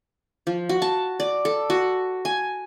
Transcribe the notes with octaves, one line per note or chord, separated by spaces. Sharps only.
F3
F#4
A5
D5
A4
F#4
G#5